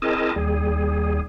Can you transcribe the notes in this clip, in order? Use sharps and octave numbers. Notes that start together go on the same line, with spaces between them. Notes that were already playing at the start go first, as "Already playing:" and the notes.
C4 E4 G#4 A#4 D#5 A5
D#2 G3 G#4